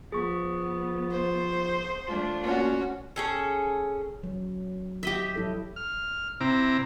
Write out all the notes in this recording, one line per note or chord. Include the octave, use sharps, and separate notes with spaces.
F3 B3 G#4 C#6
C5
A3 D4 F4
A#2 C#4 F#4
C#4 G#4 A4
F#3
G4 D#5 E5
F#3 E4 A4
F6
C3 C4 E4 A#5 D6